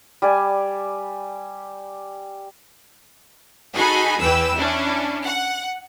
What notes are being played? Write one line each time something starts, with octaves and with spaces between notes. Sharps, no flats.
G3 D5 G#5
D#4 F#4 G#4 A4 G#5 B5
E2 E3 B4 G5 E6
C#4 D4 E4
F#5